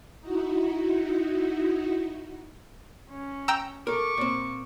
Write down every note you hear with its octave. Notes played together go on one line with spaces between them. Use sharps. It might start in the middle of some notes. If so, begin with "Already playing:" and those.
D#4 E4 F#4
C#4
G5 A#5 E6
A4 A#4 C#6 D6
A#2 C4